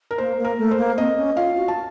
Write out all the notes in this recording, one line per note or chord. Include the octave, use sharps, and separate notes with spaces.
A#4
A#3 C5
A#3
A#4
A3
C5
A#3
C4 D#5
C#4
F4 F5
F#4
A5